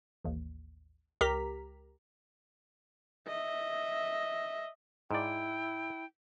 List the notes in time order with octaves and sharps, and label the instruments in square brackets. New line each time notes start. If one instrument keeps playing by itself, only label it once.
[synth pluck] A1 D#2
C#2 G4 A#4 A#5 B6
[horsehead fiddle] D#5 E5
[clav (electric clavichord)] G#2 D5 [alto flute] E4 [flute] G5